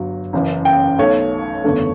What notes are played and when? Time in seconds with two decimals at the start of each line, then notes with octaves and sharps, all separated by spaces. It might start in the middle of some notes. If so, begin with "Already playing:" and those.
Already playing: G1 F#3
0.33 F#1 F#2 E3
0.65 G5
0.99 B1 B2 A3 C#5
1.64 F#1 E2 D3 A3